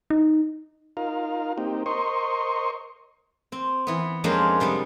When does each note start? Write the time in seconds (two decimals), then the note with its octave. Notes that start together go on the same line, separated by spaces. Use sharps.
0.10 D#4
0.97 D#4 F4 A#4 F5
1.58 A#3 C4 D#4 G4
1.86 A#4 C5 D#5 C6 C#6
3.52 C4
3.87 E3 B3
4.24 F2 G#3 A#3 C#4 D4 C5
4.60 C3 G3 G#3 B3